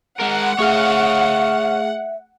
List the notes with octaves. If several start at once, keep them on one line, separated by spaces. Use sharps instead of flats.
G#3 A#4 F#5
A3 G#4 C#5 E5 F5 F6